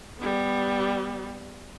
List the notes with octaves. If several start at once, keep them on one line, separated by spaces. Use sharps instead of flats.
G3 B3